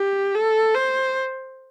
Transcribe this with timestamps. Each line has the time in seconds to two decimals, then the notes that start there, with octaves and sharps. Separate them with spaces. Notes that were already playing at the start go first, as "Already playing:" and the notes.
Already playing: G4
0.35 A4
0.74 C5